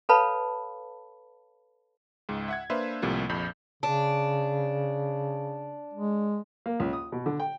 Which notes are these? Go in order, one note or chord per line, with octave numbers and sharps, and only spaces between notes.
A4 B4 C#5 F5 A5 B5
C#2 G#2
E5 F#5 G#6
A#3 D4 B4 C5 E5 F5
C2 A2 C3 F3 A#3
A#1 F2 B5 G6
C#3 D4
G#3
A#3
C#2
D#6
B2
D3
G5